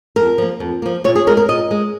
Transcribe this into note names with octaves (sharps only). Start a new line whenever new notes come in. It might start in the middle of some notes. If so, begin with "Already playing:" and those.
F2 A#4
F3 A#3
F2
F3 A#3
A#2 C#5
G#4
G#3 A#4
A#4
A#2 D#5
G#3